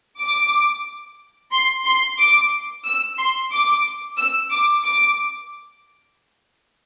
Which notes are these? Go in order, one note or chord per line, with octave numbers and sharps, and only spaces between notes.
D6
C6
C6
D6
E6
C6
D6
E6
D6
D6